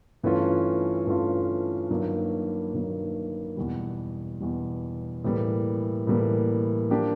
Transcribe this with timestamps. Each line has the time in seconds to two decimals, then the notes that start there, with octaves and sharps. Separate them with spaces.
0.23 G2 E3 A3 C#4 F4
1.07 G2 E3 A3 C#4 F4
1.90 G2 D#3 F#3 A#3
2.74 G2 D#3 F#3 A#3
3.57 E2 B2 G3
4.40 E2 B2 G3
5.24 A2 E3 G3 A#3
6.07 A2 E3 G3 A#3
6.90 F3 A#3 D4 G4